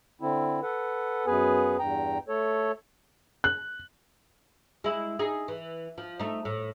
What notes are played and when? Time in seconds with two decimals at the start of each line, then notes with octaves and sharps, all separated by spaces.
0.21 D3 C4 E4
0.62 A4 B4 F#5
1.26 F#2 B3 G#4 B4 G#5
1.79 E2 G2 G5 A#5
2.28 A3 A4 C#5
3.44 F#6
4.84 G#3 E4
5.19 D#4 G#4
5.48 E3
5.98 F3
6.19 A3 D#4
6.45 A2